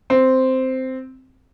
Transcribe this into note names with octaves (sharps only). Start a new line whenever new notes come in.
C4